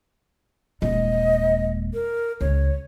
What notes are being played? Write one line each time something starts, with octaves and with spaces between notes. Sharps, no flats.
D#1 G#3 D#5
A#4
C#2 C#5